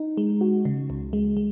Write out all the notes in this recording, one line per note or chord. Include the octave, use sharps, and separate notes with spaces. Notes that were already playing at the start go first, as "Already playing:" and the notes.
Already playing: D#4
G#3
F#4
C#3
C#2
G#3
G#3